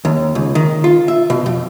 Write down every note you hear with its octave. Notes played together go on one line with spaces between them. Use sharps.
D#2
C#2
D#3
F4
E5
B2
F2